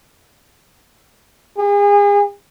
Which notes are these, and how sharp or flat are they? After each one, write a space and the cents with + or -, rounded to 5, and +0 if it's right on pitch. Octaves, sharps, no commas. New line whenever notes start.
G#4 -35